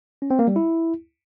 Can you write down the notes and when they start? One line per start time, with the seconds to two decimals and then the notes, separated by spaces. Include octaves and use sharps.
0.22 C#4
0.30 C4
0.39 A#3
0.47 G3
0.56 E4